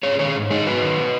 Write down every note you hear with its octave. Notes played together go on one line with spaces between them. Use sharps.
G#2 G#4 C#5
D#3 G#4 C#5
G#2
D#3 D#4 G#4
F#2 F#4 B4
D#3